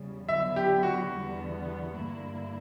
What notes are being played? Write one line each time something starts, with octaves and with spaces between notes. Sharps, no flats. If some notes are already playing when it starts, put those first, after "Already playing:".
Already playing: E2 C#3 G3
D3 F#3 B3 E5
G4
F#4
E2 D3 G3 B3
G2 D3 A#3 E4